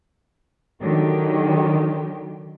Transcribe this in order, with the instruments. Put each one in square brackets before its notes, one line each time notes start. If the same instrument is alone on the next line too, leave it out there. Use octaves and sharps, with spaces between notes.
[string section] D3 D#3 F#3 G4